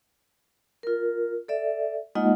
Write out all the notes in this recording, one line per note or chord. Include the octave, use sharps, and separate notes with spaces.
F4 A#4
A4 D5 E5
G#3 A#3 D#4 F4 D#5 F#5